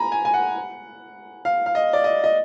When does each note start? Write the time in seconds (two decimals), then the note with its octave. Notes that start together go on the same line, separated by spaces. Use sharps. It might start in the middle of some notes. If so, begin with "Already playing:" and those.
Already playing: G#5 A#5 B5
0.12 G#5
0.25 G#5
0.34 F#5
1.45 F5
1.66 F5
1.75 D#5
1.93 D5
2.04 D#5
2.24 D#5